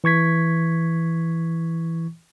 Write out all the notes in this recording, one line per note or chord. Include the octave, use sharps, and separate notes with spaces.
E3 C#6 G#6 B6